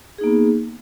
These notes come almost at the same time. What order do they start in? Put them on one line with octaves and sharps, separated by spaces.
G#4 D#4 A#3 B3